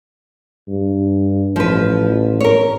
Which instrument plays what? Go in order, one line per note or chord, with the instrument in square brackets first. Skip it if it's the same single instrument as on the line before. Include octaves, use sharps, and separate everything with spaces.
[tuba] G2
[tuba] A1 [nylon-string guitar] F3 B4
[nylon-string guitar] A#4 C#5